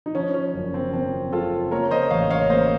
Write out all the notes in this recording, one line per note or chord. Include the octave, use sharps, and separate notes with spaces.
D#4
F3 C#4
C#4
F#1
C4
F3 C4
C#3 F4 A4
A#3 A#4 C#5
C5 D#5
A1 C#5 F5
C#5 F5
A#3 C5 D#5